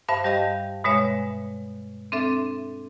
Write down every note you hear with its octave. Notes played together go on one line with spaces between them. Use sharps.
G2 C5 E5 F5 A5
G3 G4 D#5 F5 A#6
G2 B2 G#3 C#5 E5
C4 D4 A4 E5